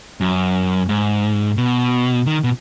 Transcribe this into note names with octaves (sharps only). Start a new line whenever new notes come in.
F#2
G#2
B2
D#3
B2